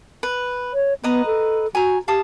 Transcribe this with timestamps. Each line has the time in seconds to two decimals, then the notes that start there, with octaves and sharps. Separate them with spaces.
0.23 B4
0.73 C#5
1.03 B3 B4 D#5 A#5
1.26 A4
1.75 F#4 G#5 A#5
2.08 G4 F5 A5 D#6